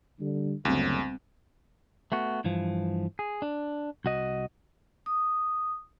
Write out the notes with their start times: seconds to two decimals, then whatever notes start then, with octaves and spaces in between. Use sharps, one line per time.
0.20 D3 G3
0.65 F#1 D2 G3 B3 C4
2.12 A3 B3 F#4
2.44 G2 E3 F3
3.19 G#4
3.42 D4
4.05 C2 F#4 D#5
5.06 D#6